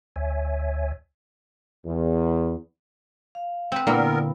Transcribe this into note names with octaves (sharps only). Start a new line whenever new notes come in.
D2 C#5 E5 G#5
E2
F5
C4 B4
A#2 D3 A#3 B3 E4 A#4 B4